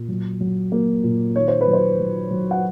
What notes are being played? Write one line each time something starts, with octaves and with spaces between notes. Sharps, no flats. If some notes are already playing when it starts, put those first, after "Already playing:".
Already playing: A#2
F#3
F#3
A#3
A#2
D#3 C#5
C5
B4
F#3
C5
F#3
F#3
F#5